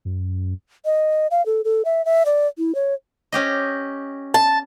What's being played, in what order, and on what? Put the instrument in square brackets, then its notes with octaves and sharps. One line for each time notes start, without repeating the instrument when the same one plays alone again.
[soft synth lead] F#2
[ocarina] D#5
F5
A4
A4
E5
E5
D5
E4
C#5
[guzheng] C#4 G4 D#5
[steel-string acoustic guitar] A5